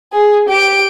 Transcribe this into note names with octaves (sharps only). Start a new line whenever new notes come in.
G#4
G4 D7